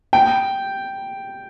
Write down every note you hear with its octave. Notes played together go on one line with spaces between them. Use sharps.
G5